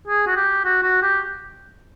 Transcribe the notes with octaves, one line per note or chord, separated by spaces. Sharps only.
G#4
F#4
G4
F#4
F#4
G4